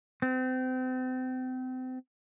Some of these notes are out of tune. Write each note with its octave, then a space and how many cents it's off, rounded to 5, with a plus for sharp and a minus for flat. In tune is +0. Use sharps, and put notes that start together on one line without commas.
C4 -35